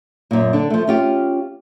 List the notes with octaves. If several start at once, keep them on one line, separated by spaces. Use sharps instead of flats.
F#2 A#2
D3 D4
F3 A3
C#4 F4 G4